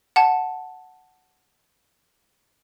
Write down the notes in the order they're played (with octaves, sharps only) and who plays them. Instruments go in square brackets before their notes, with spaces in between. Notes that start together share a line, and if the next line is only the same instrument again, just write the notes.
[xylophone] F#5 A5